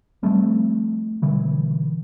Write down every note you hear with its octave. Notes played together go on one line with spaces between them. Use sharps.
F3 G3 A3 C4
B2 D3 E3 G3